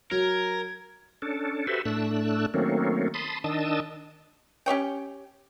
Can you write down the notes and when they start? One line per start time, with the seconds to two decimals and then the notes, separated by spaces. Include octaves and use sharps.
0.12 F#3 A#4 G#6
1.22 C#4 D4 A4
1.67 F#4 G4 A4 B4 C5 E5
1.85 A2 A3 D4 E6 F#6
2.54 D#3 F#3 A3 A#3 C4 C#4
3.14 A5 B5 C6 D#6
3.44 D#3 D4 D#5 A5 D#6 E6
4.66 C#4 G4 C#5 G5